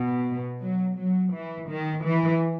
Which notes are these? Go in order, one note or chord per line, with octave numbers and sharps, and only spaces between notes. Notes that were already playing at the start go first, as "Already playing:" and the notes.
Already playing: B2
F#3
F#3
E3
D#3
E3